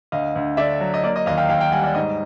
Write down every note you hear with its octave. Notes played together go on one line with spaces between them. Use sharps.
D2 D#5 F5
D2
D3 D5 E5
F#3
D#5
A#3 D5
D#5
D#2 D#5 F5
F5 G5
D#2 F5 G5
F5 G5
G3 F#5 G#5
D5
G#2 D#5